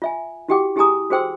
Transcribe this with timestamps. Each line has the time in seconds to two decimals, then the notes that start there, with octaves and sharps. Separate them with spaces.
0.02 F4 E5 G#5
0.49 E4 F#4 G4 F#5 G5 D6
0.76 E4 G4 G#4 G#5 A#5 D#6
1.10 F#4 G#4 C5 G5 C6 E6